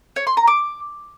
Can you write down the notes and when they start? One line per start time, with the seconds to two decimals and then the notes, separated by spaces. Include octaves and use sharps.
0.16 C#5
0.27 C6
0.37 A#5
0.47 D6